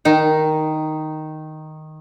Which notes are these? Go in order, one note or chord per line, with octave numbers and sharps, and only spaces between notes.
D#3 D#4